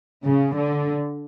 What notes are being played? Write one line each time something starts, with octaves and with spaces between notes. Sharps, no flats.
C#3
D3